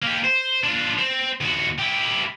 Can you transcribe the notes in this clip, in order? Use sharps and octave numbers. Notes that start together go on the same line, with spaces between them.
A#3 G4
C5
D4 F4
C4
D#2 F#4
E4 G4